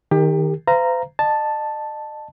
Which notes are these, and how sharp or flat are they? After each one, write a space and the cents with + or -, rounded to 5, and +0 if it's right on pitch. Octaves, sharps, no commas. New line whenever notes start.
D#3 +0 G4 +25 A#4 -15
C5 -45 F5 -35 A#5 +0
D#5 -40 A5 +0